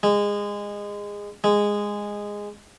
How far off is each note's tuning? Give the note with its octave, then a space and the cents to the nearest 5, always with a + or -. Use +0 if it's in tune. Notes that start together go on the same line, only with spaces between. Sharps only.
G#3 -20
G#3 -10